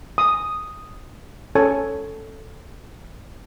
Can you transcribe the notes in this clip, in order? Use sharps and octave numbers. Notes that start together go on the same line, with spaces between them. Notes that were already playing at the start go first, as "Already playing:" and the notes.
D#6
C#4 A4 C#5 G#5